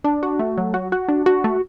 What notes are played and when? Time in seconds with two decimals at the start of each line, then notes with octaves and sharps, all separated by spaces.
0.04 D4
0.23 F#4
0.39 A3
0.58 F#3
0.74 F#4
0.92 F#4
1.08 D4
1.26 F#4
1.44 A3